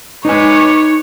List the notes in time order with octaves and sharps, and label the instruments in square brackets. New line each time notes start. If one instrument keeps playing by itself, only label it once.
[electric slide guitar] D#4 G#5 [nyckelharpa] B4 D6 [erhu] C#5